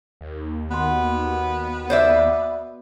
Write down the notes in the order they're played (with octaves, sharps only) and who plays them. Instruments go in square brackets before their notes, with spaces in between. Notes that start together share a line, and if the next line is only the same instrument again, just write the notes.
[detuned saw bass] D#2
[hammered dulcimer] B2 C6 [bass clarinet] B3
[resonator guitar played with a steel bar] C5 D5 E5